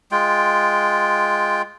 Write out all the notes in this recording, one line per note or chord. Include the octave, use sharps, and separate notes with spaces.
G#3 F4 G5